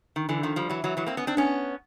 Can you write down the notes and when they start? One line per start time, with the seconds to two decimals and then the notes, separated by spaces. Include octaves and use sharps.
0.16 D#3
0.29 D3 E3
0.43 D#3 F3
0.56 F3 G3
0.70 E3 F#3
0.84 E3 F#3
0.97 E3 F#3
1.06 A#3 C4
1.17 B3 C#4
1.27 C4 D4
1.37 B3 C#4